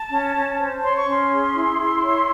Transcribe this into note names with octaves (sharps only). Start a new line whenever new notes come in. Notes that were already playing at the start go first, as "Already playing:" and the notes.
Already playing: A5
C#4
C#4
C5
C#5 C6
C#6
C#4 C6
G#4
E4
E4
C#5